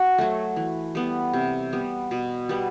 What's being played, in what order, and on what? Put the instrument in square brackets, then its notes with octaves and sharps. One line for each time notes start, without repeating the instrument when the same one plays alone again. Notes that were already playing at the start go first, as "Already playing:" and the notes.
Already playing: [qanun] F#4
F#3 A3
E3
G3 B3
C3
G3 B3
B2
G3 B3